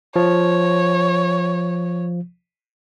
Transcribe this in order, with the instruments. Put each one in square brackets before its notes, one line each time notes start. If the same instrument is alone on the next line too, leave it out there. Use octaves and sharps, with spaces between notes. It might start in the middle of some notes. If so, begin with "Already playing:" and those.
[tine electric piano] F3 [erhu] C#5